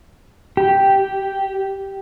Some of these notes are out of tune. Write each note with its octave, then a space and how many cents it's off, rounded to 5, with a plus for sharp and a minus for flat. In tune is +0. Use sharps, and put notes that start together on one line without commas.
G4 -5